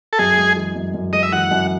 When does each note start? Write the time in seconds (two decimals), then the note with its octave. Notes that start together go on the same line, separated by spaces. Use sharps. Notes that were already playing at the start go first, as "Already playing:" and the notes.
0.13 A4
0.19 F#2 G#4
0.37 G#3
0.56 E3
0.76 F#2
0.94 F#2
1.13 G#3 D#5
1.23 E5
1.32 E3 F#5
1.51 F#2